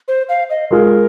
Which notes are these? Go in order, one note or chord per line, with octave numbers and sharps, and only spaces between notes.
C5
F5
D#5
G#3 F4 G#4 A#4